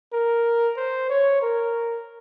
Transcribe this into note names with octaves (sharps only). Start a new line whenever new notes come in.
A#4
C5
C#5
A#4